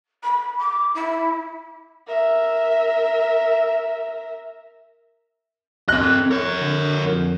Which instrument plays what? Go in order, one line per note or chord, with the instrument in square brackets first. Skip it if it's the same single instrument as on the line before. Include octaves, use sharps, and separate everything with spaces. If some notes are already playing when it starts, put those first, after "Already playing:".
[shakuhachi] B5
D6
E4
[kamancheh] A#4 E5
[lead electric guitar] C4 D#5 [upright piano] F#6
[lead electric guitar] A#4 C#5
[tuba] D3
F2